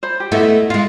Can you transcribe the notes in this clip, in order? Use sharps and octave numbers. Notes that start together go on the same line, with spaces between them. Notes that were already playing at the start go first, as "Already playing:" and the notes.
C5 B5
G4
A3 B3 E4 D#5
G#3 F4 F5